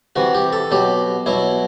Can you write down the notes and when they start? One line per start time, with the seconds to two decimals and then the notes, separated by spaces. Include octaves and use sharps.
0.16 C3 E3 F#4
0.35 G4
0.53 A4
0.71 B2 F#3 G4
1.26 B2 F#3 E4